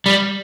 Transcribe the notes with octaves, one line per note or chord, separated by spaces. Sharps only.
G3